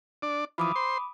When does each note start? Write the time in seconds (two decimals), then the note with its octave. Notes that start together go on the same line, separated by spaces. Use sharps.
0.22 D4 D5
0.58 E3 F3 B5 D6 D#6
0.76 C5 C6